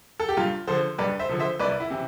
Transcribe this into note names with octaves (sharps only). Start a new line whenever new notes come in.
A4
G4
G2 F4
D3 F3 A4 C5
G2 B4 D5
C5 E5
D3 F3
C5 E5
C2 B4 D5
E4
C3 E3